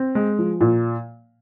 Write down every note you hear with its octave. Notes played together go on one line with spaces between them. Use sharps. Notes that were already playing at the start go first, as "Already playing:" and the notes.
Already playing: C4
G#3
F3
A#2